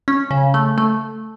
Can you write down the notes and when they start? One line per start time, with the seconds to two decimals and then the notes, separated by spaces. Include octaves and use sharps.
0.08 C#4
0.31 C#3
0.54 A3
0.78 A3